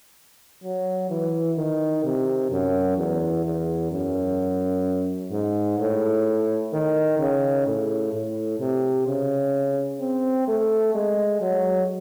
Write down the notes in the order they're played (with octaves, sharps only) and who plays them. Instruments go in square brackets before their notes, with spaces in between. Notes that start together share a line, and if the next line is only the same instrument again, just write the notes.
[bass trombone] F#3
E3
D#3
C3
F#2
E2
E2
F#2
G#2
A2
D#3
C#3
A2
A2
C3
C#3
C4
A3
G#3
F#3